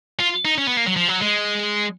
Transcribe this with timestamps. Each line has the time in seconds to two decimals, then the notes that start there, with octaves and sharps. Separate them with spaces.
0.19 F4
0.45 D#4
0.58 C#4
0.67 B3
0.77 A#3
0.87 F#3
0.96 F3
1.08 F#3
1.22 G#3